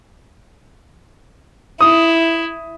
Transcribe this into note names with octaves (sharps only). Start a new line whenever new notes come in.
E4 D#6